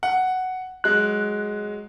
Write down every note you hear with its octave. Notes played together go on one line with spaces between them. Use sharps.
F#5
F#3 G#3 F#6